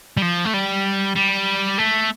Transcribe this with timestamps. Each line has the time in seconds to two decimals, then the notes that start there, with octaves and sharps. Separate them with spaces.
0.17 G3
0.22 F3
0.45 A3
0.54 G3
1.16 G3
1.78 A3